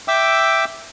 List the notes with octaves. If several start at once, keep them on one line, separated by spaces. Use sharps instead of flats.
E5 G5 D6 E6